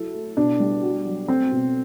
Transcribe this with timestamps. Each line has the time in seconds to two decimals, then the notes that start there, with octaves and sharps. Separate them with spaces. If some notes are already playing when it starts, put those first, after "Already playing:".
Already playing: F#3 E4 A4
0.14 A3
0.37 B2 D4
0.60 G3
0.83 F#4
1.05 F#3
1.28 A3 C4
1.52 B2